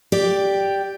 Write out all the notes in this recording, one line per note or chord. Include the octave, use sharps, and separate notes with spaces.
G4 D5